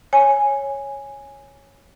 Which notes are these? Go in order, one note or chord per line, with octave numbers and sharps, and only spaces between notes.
C#5 G#5